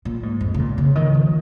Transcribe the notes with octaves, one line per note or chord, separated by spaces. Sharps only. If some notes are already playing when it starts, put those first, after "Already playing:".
A#2
G#2
F2
C#3
A#2
C#3
D#3
F3